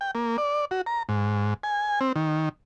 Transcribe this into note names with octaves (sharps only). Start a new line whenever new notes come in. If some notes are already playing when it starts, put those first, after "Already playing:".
G5
A#3
D5
F#4
A#5
G#2
G#5
C4
D#3